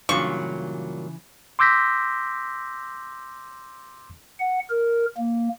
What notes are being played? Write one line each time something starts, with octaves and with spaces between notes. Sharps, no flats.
G2 A#2 C#3 E3 F#3 C#6
C6 D6 E6 G6 A#6 B6
F#5
A#4
A#3